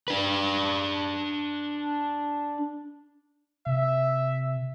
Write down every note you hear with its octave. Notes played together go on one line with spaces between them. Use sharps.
D4 B4
C3 E5